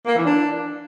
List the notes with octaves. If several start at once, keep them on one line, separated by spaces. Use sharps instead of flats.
A#3
E3
D4